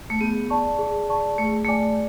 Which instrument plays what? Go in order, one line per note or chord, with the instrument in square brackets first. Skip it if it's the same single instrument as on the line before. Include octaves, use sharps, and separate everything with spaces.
[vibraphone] A3
[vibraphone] B3 [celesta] G#4
[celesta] D5 A5 C#6
G#4
D5 A5 C#6
[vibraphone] A3 [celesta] G#4
[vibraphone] A3 [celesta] D5 G#5 D6